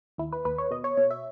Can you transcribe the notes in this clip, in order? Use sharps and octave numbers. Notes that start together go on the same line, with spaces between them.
D#2 E4
B4
D#2 B4
C#5
B2 D#5
C#5
B2 C#5
E5